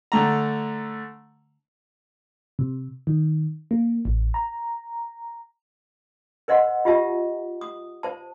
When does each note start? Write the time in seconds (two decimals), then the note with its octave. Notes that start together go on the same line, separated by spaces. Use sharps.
0.12 D3 A3 A#5
2.59 C3
3.07 D#3
3.71 A#3
4.05 A1
4.34 A#5
6.48 A#4 C5 D#5 F#5 C6
6.85 F4 G4 D#5 E5 A5
7.61 D#6
8.03 C5 A5